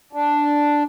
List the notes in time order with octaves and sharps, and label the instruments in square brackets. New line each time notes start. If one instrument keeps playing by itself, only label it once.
[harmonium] D4